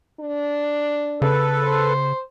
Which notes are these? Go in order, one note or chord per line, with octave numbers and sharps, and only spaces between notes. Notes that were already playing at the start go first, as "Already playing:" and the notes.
D4
C#3 A4 B4
C5